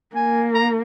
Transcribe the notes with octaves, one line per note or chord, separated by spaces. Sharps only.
A#3 G#5
A#5